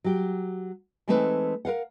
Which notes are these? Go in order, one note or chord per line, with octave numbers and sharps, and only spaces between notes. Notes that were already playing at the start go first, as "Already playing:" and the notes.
F#3 G4
E3 G#3 A3 C4 D#4 B4
A#4 B4 F5 F#5